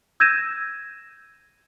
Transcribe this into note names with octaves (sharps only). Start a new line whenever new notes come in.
E6 G6 G#6 A#6 D#7 E7